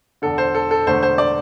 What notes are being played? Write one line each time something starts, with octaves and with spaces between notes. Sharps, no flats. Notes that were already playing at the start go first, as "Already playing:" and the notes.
E1 E2 D3 A4
C5
A4
A4
E1 E2 D3 A3 C5
C5
D5